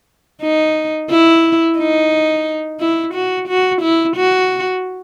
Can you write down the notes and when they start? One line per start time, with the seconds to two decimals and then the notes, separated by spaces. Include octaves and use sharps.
0.42 D#4
1.10 E4
1.78 D#4
2.80 E4
3.14 F#4
3.48 F#4
3.82 E4
4.16 F#4